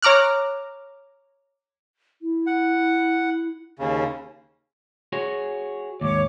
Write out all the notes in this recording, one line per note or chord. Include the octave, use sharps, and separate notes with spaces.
C#5 A#5 D6 F6 F#6
E4
F#5
D#2 C#3
F#4 G#4 C#5
D#2 G#2 C#5 D6